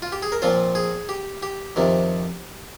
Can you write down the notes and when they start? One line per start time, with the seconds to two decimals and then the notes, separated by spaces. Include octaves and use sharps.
0.02 F4
0.12 G4
0.22 G#4
0.32 A#4
0.42 A#2 F3 C4 F4 C5
0.75 G#4
1.09 G4
1.43 G4
1.76 F2 C3 D#3